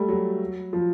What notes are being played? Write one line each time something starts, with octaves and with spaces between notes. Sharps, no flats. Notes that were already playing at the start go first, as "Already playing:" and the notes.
Already playing: G3 A3
F#3
F3